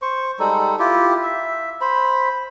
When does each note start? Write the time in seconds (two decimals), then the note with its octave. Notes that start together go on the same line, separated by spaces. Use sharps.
0.02 C5 C#6
0.40 G3 G#3 D#4 A4
0.79 E4 F4 G4
1.23 E5
1.81 C5 B5